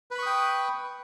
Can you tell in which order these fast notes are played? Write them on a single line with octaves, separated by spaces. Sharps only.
B4 B5 C#6 D#6 G5